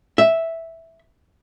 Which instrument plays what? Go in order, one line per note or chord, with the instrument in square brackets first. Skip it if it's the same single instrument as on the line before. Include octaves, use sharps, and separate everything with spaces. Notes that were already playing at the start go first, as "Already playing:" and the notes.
[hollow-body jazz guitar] E5